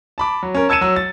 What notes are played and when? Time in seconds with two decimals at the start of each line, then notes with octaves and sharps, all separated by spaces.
0.18 A5 B5 D6
0.43 F#3
0.55 C#4 A#4
0.69 A5 E6 G#6 C#7 D#7 E7
0.81 F#3 E6
0.96 A6